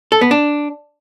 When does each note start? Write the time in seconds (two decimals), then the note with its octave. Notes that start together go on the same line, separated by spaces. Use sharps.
0.12 A4
0.21 B3
0.31 D4